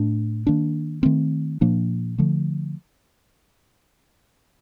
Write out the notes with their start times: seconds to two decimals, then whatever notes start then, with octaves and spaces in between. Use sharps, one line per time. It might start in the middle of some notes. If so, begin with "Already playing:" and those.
Already playing: A2 A3 D4
0.47 D#3 A#3 D4
1.03 D#3 A3 C4
1.61 A#2 F3 A#3 D4
2.18 D3 F3 A3